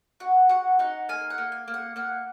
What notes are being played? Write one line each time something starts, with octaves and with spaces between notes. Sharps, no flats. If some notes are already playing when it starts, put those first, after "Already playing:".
F#4 F#5
F#4 F#5
D#4 F#5
A#3 G#5
F#5
A#3
G#5
A#3
F#5
A#3 F#5